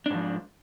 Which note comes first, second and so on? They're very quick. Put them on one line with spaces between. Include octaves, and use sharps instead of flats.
D4 G#2 F3